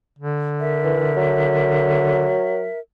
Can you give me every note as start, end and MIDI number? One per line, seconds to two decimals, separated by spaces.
0.18 2.37 50
0.60 2.79 70
0.60 2.79 76
0.84 1.08 52
1.17 2.67 54